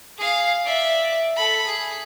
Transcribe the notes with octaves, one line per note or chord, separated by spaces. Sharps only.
G#4 F5
D5 E5
A4 B5
G#4